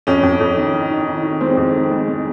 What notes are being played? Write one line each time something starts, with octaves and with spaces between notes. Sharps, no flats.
F2 C#4
F2
F2
D#3
D#3
D#3
D#3
D#3
G#3 C4
F2
D#3
G#3
G#3